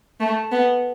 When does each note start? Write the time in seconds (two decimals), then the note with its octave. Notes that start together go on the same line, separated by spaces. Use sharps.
0.20 A3
0.52 B3